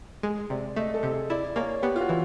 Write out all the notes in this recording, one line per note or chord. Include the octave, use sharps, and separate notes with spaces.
G#3 G#4
C3 D5
A3 D#5
A4
C3
G#4
E4 D5
A#3 C#5
B3 G4
F4
F#4
E3